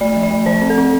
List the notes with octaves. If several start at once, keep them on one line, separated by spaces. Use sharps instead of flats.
A3 D5
F3
D5
A3
F3 C5
C4
A4
C4